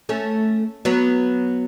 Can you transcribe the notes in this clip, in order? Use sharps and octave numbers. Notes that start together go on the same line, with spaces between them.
A3 C#4
F#3 B3